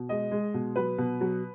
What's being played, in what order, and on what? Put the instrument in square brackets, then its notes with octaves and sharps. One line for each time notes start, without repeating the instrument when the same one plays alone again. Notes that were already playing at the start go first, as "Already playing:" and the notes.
Already playing: [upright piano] B2
G#3 D#5
G#3
B2
F#3 B4
B2
F#3